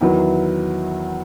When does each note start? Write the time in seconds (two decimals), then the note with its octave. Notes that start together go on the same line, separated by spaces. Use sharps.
0.01 E2 D#3 F#3 B3 E4